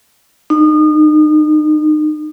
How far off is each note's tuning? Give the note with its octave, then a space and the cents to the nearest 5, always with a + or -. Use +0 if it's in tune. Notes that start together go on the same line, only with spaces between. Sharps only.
D#4 -35